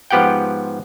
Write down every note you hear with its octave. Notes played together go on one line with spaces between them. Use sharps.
G#2 F3 B3 G4 F#5 G5